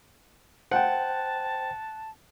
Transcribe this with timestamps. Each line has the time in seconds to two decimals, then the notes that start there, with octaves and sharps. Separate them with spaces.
0.71 C5 F#5 G5 A5